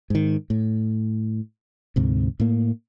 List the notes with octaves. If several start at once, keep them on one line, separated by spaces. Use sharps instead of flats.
G#2 D#3
A2
D2 G#2 C3
A2 A#3